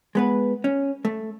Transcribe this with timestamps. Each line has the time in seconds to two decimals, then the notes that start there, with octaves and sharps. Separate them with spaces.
0.15 G#3 B3 B4
0.64 C#4
1.05 A3